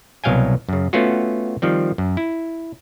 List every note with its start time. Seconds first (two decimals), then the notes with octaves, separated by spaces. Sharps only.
0.24 C2 B2 F#3 F5 G5 G#5
0.69 F#2 C#3
0.93 A3 B3 C#4 F4 F#4
1.62 D#3 F3 G3 C4
1.98 F#2
2.17 E4